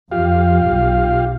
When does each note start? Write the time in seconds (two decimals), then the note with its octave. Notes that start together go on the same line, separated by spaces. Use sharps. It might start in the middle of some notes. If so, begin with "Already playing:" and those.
0.12 F2 F4 G4 F5
0.65 B1